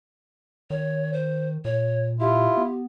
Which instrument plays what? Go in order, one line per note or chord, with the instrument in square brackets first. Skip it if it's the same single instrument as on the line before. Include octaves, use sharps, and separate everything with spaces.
[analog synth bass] D#3 [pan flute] C#5
[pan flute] C5
[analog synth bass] A#2 [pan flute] C#5
[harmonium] E4 F4 [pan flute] G4
[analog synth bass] B3